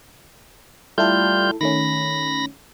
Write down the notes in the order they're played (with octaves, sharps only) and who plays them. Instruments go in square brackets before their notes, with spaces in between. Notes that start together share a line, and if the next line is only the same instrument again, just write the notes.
[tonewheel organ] G3 F4 G6 [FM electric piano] A3 E4 A4
[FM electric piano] D#3 A3 C#4 [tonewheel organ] B5 A#6